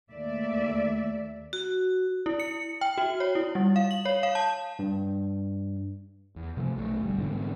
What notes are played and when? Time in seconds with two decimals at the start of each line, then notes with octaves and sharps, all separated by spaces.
0.11 D#2 A3 D5 E5
1.53 F#4
2.26 E4
2.40 C#7
2.81 G5
2.98 F#4
3.20 C#5
3.35 E4
3.55 G3
3.76 F5
3.91 F#7
4.05 C#5
4.23 F5
4.35 A5
4.79 G2
6.36 E2
6.57 C3 F3 G3 A3
6.76 B1 F#3 A3
7.02 G1 G3
7.18 G#2 B2 D3 E3